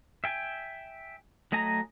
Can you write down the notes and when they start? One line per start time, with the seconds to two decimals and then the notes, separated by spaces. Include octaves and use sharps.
0.24 E5 G5 G#5
1.52 F#3 A3 D#5 G#5 A#5